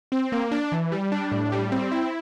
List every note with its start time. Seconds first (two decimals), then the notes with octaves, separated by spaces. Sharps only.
0.12 C4
0.32 A#3
0.51 D4
0.72 E3
0.92 G3
1.12 D4
1.32 A2
1.52 G3
1.72 C4
1.92 E4